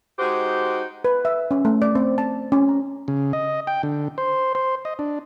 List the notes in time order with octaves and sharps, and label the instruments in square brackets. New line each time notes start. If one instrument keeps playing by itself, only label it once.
[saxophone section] G#3 D#4 F#4 G4 C5
[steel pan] B4
E5
C#4
A3
D5
C4
A5
C#4
A#5
[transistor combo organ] C#3
D#5
G5
D3
C5
C5
D#5
D4